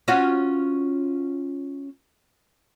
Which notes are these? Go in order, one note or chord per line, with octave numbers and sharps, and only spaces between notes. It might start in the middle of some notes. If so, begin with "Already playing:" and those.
C#4 F4 F#4